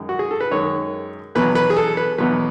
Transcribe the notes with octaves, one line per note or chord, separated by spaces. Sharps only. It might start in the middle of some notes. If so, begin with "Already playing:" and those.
Already playing: F#2 D#3 G#3
F#4
G#4
A4
B4
F#2 D#3 G#3 C#5
E2 B2 F#3 B4
B4
G#4
A4
B4
E2 B2 F#3 B4